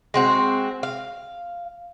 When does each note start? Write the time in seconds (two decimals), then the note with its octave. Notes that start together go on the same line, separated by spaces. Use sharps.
0.14 G#3 C4 F#4
0.83 F5